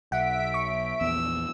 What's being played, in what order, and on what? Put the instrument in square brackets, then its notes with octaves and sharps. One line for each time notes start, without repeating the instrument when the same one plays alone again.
[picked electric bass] B1 [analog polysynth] E5 B6 D7 [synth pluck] F#5
[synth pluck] C#6
[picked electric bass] A#1 E2 B3 [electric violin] E6